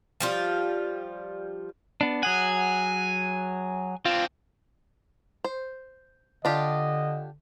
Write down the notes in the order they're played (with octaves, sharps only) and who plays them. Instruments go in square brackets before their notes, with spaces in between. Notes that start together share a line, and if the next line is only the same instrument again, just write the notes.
[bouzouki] F3 G3 F4
[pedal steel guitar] B3 D4
[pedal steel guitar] F#3 G#4 F#5 [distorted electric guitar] G#5
[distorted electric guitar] C4 D4 [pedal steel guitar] F4
[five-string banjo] C5
[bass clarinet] D3 [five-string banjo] D4 F4 G4 [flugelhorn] D#5